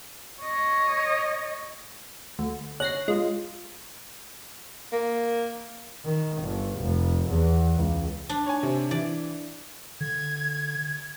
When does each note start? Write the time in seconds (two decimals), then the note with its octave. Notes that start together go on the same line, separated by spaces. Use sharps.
0.42 C#5 D#5
2.39 D2
2.80 C#5 F#6 A#6 C7
3.08 G#3 F4
4.93 A#3
6.05 D#3
6.42 G1
6.79 F1
7.28 E2
7.76 C#2
8.29 D4
8.46 C#5 G#5
8.63 C3
8.91 E3 D5
10.01 D3 G#6